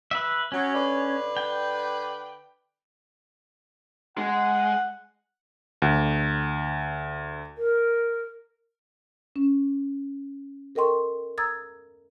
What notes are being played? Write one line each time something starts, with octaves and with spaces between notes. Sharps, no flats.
B4 E5
F#3 C#4
D3 B4 D5
G5
G#3 F#5
D2
A#4
C#4
A4 A#4 D#5 G5 C6 C#6
A#5 D#6 E6 G#6 A6